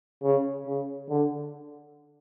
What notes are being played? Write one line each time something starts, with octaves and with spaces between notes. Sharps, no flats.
C#3
C#3
D3